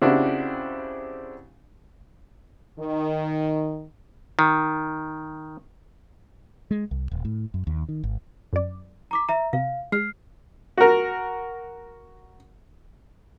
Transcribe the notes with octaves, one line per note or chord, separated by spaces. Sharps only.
C#3 C4 D4 E4 F#4 G4
D#3
D#3
G#3
C2
D#1
A2
F#2
D#2
D#3
G#1
F#2 D5
A#5 D6 B6
E5 A#5
C3 F5
G#3 F6 C7
F#4 A#4